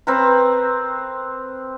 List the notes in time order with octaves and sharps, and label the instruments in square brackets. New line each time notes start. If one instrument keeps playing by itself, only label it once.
[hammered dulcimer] C4 A#4 B4